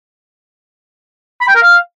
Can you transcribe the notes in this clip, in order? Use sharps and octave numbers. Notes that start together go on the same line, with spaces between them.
B5
G5
A#4
F5